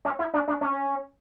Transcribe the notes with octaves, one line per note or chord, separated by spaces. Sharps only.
C#4
E4
D4
D4
C#4